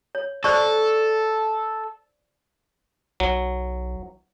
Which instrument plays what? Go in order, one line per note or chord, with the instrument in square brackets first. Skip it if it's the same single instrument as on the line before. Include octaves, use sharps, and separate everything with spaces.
[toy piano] C#5
[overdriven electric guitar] A4 [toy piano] C5 D5 C#6
[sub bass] B1 [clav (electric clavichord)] F#3